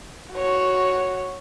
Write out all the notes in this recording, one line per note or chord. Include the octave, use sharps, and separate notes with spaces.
F#4 C#5